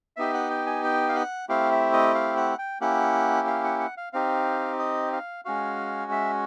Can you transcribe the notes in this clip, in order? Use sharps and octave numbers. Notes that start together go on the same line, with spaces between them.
B3 D#4 G4 E5
F#5
G5
G#5
G5
F5
F#5
A3 C4 E4 G4 F5
E5
D#5
F5
F#5
G5
A#3 C#4 E4 G4 F#5
F5
F#5
F#5
F5
C4 D#4 G4 F5
D#5
F5
G#3 C#4 F#4 F5
E5